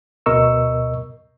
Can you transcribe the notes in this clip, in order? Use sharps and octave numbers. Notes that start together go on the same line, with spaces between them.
D2 B2 A#4 D#5 C#6 E6